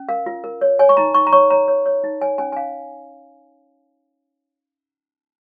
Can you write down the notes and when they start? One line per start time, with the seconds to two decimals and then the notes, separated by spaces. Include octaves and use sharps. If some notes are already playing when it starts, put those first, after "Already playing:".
Already playing: C#4
0.09 A#4 F5
0.26 F4
0.44 A#4
0.61 C#5
0.79 C#5 G#5
0.89 C#6
0.97 D#4 A#5
1.14 D#4 C#6
1.27 A#5
1.33 C#5 C#6
1.50 C#5 A#5
1.68 C#5
1.86 C#5
2.04 D#4
2.21 C#5 G#5
2.38 C#4 G#5
2.52 G#5
2.57 C#4 F5